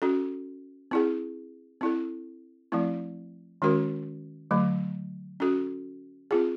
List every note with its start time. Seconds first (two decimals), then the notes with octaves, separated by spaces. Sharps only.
0.02 C#4 F#4 A4
0.91 C4 E4 G#4
1.81 C4 E4 A4
2.72 F3 A3 C4 E4
3.62 D#3 G#3 C#4 F#4 A#4
4.51 D3 F#3 A3
5.40 C#4 F#4 A4
6.31 C4 F4 G#4